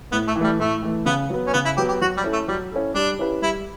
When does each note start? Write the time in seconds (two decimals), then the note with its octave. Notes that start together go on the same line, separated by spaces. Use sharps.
0.12 A2 B3
0.28 A3
0.36 E3
0.41 G3 A3
0.60 A2 A3
0.83 E3 A3
1.06 C#3 B3
1.30 F#3 B3
1.47 C#4
1.53 C#3 B3
1.65 E4
1.77 F#3 B3 G4
1.89 G4
2.01 F#3 F#4
2.17 G3
2.24 C#4 E4 A4
2.33 A3
2.48 F#3 G3
2.72 C#4 E4 A4
2.94 G3 D4
3.19 C#4 E4 G4 B4
3.42 G3 E4